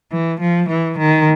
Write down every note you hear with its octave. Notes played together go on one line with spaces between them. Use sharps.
E3
F3
E3
D#3